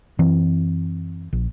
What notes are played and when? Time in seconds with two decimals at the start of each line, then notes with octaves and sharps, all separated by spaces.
0.19 F#2 E3 C4
1.33 A#1